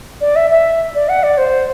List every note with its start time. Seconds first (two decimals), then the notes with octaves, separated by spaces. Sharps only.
0.21 D5
0.36 E5
0.50 E5
0.95 D5
1.09 F#5
1.23 D5
1.38 C5